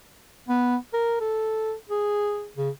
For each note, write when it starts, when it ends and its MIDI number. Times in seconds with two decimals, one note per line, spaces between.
0.48 0.76 59
0.93 1.16 70
1.20 1.73 69
1.89 2.48 68
2.57 2.70 49